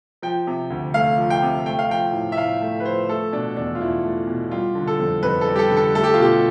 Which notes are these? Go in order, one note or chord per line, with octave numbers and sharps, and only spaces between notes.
F3 G5
C3
D2
A3 F5
F3
G5
C3
A3 G5
F5
F3 G5
A2
E5
A2 F5
A3
B4
F3 C5
A3 A4
B2 D4
E2 D4
F4
E2 E4
A3
B2
G3 F4
D3
A4
F2
F2 B4
A4
G3
G4
A4
D3
A4
A3 A4
G4
F4
B2 G4